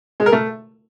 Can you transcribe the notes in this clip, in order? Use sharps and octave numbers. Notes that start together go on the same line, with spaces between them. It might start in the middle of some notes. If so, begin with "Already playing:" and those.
G#3
A#4
A3